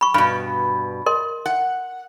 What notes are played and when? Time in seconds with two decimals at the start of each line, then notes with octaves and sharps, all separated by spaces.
0.01 B5 C#6
0.14 G2 B2 B5
1.06 A#4 D#5 C6
1.46 F#5